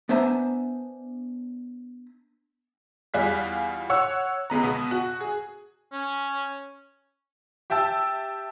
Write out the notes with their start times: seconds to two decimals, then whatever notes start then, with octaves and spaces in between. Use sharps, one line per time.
0.09 B3 D4 C5 E5 G#5 A#5
3.14 E2 G3 F4 G#4 F#6 B6
3.90 C#5 F#5 E6
4.50 C#2 G#3 B3 A#5
4.63 B2 B3
4.91 F#4
5.21 G#4
5.93 C#4
7.70 G4 E5 G5 A5 E6